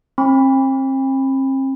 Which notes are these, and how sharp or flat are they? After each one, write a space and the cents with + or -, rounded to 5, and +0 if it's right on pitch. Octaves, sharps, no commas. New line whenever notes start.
C4 +40 B5 +0